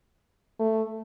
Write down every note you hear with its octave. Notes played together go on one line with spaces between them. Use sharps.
A3